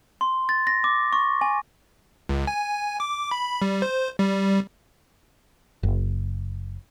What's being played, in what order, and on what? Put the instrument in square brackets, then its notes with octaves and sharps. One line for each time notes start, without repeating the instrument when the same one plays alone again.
[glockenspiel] C6
A6
A#6
D6
C#6
G#5
[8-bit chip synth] C#2
G#5
D6
B5
G3
C5
G3
[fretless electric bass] F#1